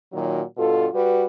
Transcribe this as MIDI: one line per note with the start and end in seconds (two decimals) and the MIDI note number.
0.12 0.43 46
0.12 0.43 51
0.12 0.43 54
0.57 0.87 43
0.57 0.87 47
0.57 0.87 65
0.57 0.87 69
0.94 1.26 55
0.94 1.26 66
0.94 1.26 71